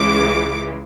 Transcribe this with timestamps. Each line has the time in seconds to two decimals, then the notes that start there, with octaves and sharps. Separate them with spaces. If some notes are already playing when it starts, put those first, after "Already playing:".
Already playing: C#2 C#3 E3 G#3 D6